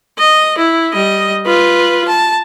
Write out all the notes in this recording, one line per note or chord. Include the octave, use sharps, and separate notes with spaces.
D#5
E4
G3 D#5
F4 B4
A5